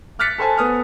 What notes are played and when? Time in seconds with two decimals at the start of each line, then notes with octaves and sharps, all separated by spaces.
0.19 D6 F6 F#6 A6 B6 C#7
0.38 A4 C5 G#5 A5
0.58 B3 D#6 F6